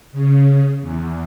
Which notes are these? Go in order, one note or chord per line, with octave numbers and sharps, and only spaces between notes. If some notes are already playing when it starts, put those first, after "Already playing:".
C#3
E2